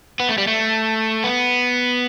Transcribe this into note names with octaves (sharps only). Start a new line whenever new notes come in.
B3
A3
G3
A3
B3